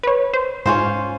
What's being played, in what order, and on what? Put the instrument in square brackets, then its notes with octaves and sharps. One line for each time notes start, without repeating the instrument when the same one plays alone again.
[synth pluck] B4 C#5
C5
[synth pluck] G#2 [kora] C#4 F4 C5